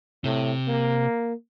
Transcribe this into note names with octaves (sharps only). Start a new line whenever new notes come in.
A2 C3
A#3